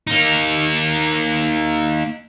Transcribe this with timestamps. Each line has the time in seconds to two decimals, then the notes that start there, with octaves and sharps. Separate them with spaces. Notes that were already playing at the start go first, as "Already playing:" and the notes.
0.07 A#3 D#4